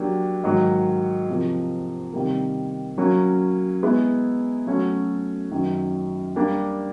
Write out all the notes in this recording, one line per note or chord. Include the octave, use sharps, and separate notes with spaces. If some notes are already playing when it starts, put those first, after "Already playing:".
Already playing: F#3 A#3 D4 G4
G#2 D#3 F#3 A#3
C3 F3 A#3
C3 D#3 G3 A#3
F#3 A#3 C#4
G#3 B3 E4 G#4
F#3 A3 C#4 F#4 A4
F#2 D#3 F#3
G3 A#3 D4 G4